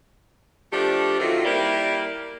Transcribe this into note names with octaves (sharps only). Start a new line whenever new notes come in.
F3 A3 D4 G4
D#3 F#3 A3 C4 F4
G3 A#3 E4 G4 A#4 D5